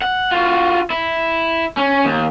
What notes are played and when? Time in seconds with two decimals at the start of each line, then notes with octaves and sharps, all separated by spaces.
0.02 F#5
0.31 F4 F#4
0.90 E4
1.77 C#4
2.05 D#2